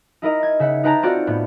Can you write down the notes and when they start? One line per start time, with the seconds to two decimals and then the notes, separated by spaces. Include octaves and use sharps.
0.22 D#4 E4 A#4 D#5
0.43 G#6
0.60 C#3 E5 F#5
0.84 D#4 B4 G5 A5 A#5
1.03 C4 F4 F#4 A4 D5 F#5
1.27 A2 B3